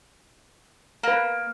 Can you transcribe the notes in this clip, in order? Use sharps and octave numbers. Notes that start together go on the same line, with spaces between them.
A#3 B4 A#5